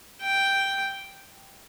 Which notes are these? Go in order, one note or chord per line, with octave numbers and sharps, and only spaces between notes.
G5